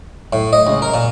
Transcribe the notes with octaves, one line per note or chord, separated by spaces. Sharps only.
A2
D#5
C#2
A#4
A#2